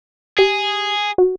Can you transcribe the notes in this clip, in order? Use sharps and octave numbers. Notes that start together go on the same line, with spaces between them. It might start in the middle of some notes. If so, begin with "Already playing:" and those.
G4 G#4
F#4